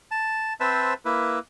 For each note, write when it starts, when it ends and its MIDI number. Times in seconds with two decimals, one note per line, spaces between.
0.11 0.53 81
0.60 0.94 60
0.60 0.94 71
0.60 0.94 72
0.60 0.94 76
0.60 0.94 81
1.05 1.39 58
1.05 1.39 64
1.05 1.39 71